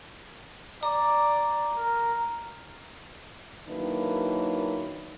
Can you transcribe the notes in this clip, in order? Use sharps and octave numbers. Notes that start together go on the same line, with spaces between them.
D5 A#5
A#4
D#3 F#3 A#3 D4 E4 B4